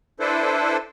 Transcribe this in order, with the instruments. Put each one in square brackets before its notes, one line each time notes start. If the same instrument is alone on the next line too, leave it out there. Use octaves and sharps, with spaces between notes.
[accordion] D4 E4 A4 B4 C5